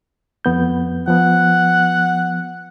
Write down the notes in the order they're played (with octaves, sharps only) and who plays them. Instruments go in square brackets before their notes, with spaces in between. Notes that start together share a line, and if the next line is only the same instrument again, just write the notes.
[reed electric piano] F2 B3 G6
[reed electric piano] F3 B3 [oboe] F#5